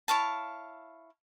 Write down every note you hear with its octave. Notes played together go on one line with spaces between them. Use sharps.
E4 C#5 F5 A5